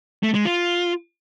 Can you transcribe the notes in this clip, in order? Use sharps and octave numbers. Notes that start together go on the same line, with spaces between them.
A3
G#3
F4